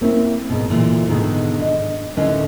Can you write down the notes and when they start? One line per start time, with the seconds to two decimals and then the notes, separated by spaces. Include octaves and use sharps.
0.01 A#3 C4 C#4 E4
0.50 G#2 B2
0.70 D2 A#2 E3
1.09 G#2 B2 D3 D#3
1.59 D4 D#5
2.16 D#2 A2 D3 C#4 B4 D#5